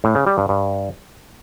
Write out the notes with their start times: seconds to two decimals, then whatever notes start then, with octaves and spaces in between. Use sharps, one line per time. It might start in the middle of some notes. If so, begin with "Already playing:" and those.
0.04 A2
0.15 C#3
0.27 G3
0.38 G2
0.49 G2